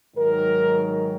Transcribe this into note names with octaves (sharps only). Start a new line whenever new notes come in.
G#2 D#3 F#3 A#4